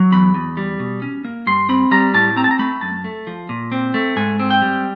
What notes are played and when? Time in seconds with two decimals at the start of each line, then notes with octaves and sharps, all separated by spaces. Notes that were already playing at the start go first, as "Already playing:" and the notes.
Already playing: F#3
0.12 E2 B5
0.34 E2
0.57 G3
0.80 B2
1.02 C#4
1.25 A#3
1.47 G2 C6
1.69 C4 B5
1.91 G3 A#5
2.14 A2 A5
2.37 C4 A#5
2.44 A5
2.51 A#5
2.59 A3 B5
2.81 F#2 A5
3.04 A3
3.27 F3
3.49 A#2
3.72 C4
3.94 A3
4.16 G#2 G#5
4.40 C4
4.51 G5
4.62 G3